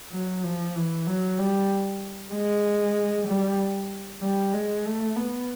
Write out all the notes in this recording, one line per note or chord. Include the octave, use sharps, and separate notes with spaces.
F#3
F3
E3
F#3
G3
G#3
G3
G3
G#3
A3
B3